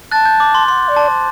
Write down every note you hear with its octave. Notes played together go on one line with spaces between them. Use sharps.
A5 F#6 A6
G6
D6
C6
F#5 C6
D5
A5
C5